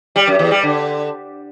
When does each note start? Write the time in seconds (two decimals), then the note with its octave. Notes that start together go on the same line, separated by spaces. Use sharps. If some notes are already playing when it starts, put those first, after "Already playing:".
0.16 G3
0.27 F#2
0.39 E2
0.51 G3
0.63 D3